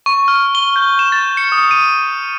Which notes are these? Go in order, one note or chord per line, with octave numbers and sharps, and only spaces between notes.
C#6
F6
G7
G6
E7
A6
C#7
D#6
D#7